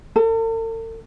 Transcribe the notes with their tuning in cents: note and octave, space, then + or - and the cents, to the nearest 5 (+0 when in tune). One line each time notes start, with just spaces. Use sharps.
A4 +45